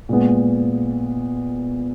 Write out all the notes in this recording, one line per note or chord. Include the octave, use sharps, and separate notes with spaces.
A#2 G#3 B3